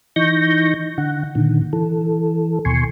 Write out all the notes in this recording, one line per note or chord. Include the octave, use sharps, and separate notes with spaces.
E3 D#4 C#6 G6 A#6
D3 F#5
A#2 D3 D#3
E3 A4
D#2 B2 G#5 C6 C#6